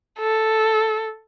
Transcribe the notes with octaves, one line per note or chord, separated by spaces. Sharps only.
A4